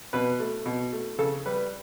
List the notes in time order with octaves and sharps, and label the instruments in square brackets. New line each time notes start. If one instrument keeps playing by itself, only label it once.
[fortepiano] B2 B4
A3
B2
A3
C#3 A4
G3 B4